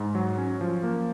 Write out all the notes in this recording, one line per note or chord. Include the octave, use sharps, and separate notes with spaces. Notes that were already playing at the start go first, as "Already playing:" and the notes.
Already playing: G#2
F#3
C#4
F3
A#3